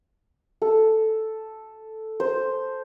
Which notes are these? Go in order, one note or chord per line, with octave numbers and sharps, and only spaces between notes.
A4
C5